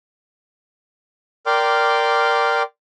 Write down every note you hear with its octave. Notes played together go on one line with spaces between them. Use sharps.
A#4 D5 G5 C6 D6 F6